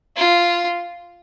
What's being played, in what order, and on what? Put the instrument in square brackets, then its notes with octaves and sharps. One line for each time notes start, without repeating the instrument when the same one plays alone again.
[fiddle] F4